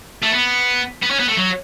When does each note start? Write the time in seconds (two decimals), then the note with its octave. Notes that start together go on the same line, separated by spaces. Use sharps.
0.22 A3
0.31 B3
1.02 B3
1.10 C#4
1.19 B3
1.28 A3
1.37 F#3